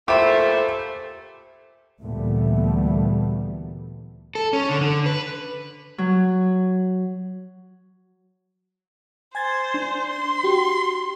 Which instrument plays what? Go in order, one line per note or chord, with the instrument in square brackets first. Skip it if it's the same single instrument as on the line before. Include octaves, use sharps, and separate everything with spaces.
[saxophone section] A#2 F3 A3 [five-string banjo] G4 B5 [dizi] C5 [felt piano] E5
[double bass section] D2 A#2 E3 G3 A3 B3
[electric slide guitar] A4
C#4
D3
D3
B4
[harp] F#3
[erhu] C5 [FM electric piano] G#5 G#6 A6
[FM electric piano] D4
[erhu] C6
[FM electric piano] F#4 G4